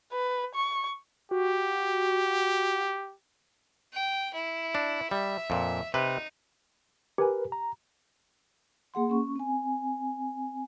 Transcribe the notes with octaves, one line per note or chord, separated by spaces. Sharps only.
B4
C#6
F#4 G4
G5
E4
D4
G3 E5
F2 A#2
C3 D#4 B4
G4 A#4 B4 G#5
A#5
A#3 G#4 F#5 C6
C#4 C#6
C4 G#5